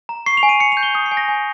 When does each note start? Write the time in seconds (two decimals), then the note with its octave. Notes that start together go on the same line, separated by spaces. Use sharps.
0.09 A#5
0.26 C#6 C7
0.37 F7
0.43 G#5
0.49 D#7
0.60 G#5 C#7
0.72 F7
0.77 G6
0.83 G7
0.94 D#6 F7
1.06 C7
1.11 G#5
1.17 A#6
1.28 G#5